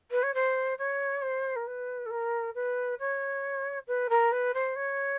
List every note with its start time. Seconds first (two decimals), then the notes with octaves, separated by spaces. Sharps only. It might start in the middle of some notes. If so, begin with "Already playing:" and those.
0.11 B4
0.22 C#5
0.34 C5
0.78 C#5
1.21 C5
1.55 A#4
1.66 B4
2.05 A4
2.10 A#4
2.54 B4
2.99 C#5
3.87 B4
4.09 A#4
4.31 B4
4.53 C5
4.75 C#5